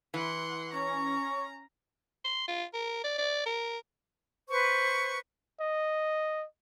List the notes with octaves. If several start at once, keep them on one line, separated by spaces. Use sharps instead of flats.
E3 F#5 C6
C#4 A#5 C#6
C6
F4
A#4
D5
D5
A#4
B4 C5 C#6
D#5